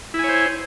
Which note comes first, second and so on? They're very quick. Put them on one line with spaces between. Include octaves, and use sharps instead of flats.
E4 G#5 C#5 C5